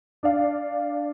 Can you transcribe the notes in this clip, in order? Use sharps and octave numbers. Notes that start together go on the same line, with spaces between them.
D4 D5 F5